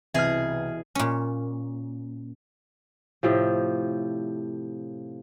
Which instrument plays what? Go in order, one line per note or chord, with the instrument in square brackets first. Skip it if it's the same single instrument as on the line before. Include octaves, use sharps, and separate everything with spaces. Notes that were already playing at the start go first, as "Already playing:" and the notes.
[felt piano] C2 [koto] B2 G#4 G#5 [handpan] E3 [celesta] E5 F6
[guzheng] A#2 C#4
[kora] A2 C3 F3